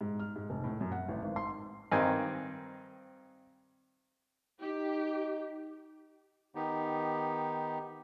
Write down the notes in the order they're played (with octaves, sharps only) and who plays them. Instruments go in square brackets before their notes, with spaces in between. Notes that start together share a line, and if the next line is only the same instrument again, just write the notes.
[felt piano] G#2
F6
G#2
F1
A2
F#2
F#5
A1
G#1
C6
[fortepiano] G2 D#3 C4 D#5 G#5
[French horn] D#4 [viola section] G4
[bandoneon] D#3 B3 D#4 G4